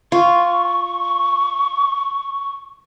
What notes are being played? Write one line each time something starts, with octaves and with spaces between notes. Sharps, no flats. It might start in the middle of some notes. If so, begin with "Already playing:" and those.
F4 C#6